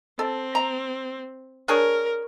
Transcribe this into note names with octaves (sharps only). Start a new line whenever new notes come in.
C4 A4
A#5
D4 G#4 A#4 C#5